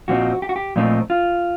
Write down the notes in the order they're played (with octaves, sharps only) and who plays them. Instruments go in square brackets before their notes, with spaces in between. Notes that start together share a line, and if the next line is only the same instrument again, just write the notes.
[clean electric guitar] A#2 F3 A3 C4 D#4 F#4
G4
F#4
G4
A#2 F3 A3 C4 D#4
F4